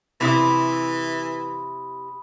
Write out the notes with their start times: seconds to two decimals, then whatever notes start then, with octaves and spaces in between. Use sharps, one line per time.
0.21 C3 E3 E4 B5 D#6